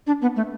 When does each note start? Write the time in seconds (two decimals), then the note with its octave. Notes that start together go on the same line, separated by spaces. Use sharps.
0.07 D4
0.22 B3
0.36 A3